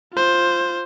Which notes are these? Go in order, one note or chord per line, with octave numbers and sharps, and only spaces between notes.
F4 C5